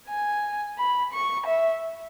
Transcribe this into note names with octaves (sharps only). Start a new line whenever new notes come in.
G#5
B5
C#6
E5